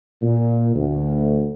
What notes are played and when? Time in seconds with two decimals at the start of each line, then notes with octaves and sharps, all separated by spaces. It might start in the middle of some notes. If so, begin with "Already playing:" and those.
0.22 A#2
0.75 D2